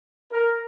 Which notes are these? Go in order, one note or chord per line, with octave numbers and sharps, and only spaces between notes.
A#4